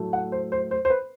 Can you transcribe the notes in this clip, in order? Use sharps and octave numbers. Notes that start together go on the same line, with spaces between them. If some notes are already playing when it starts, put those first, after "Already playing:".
Already playing: A2 F#3 A3
F#5
C5
C5
C5
C5
B4